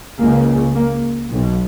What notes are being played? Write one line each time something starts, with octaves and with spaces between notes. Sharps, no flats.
C#2 C#3 A#3
A#3
B1 B2